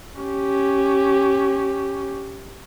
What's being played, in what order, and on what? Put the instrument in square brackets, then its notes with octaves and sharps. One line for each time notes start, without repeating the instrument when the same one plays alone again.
[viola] C#4 G4